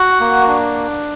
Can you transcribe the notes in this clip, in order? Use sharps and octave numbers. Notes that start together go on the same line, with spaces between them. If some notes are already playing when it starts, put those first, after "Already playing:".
Already playing: F#4 F#5
A#3
D4